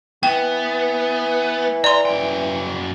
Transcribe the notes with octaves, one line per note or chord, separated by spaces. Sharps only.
E3 B3 G5
D5 A#5 C6
F#2 G5